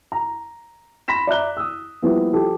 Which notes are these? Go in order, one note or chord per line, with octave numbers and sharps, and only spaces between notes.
A#5
B5 C6 A#6 B6 E7
D5 E5 A#5 F#6 G7
D#6 E6
E3 F3 G3 A#3 B3 E4
F3 G4 A4